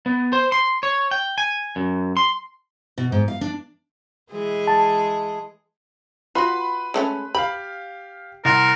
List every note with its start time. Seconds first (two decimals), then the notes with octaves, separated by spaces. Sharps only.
0.06 B3
0.33 C5
0.52 C6
0.83 C#5
1.11 G5
1.38 G#5
1.76 F#2
2.17 C6
2.98 B2
3.12 G#2
3.28 F5
3.41 D4
4.32 E3 G#3 G#4
4.67 A5
6.35 F4 F#4 B4 B5 C6
6.94 G#3 A3 C#4
7.35 G4 F5 B5
8.45 C2 A#4 F#5 C6